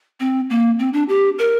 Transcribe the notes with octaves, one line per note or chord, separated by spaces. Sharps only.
C4
A#3
C4
D4
G4
A#4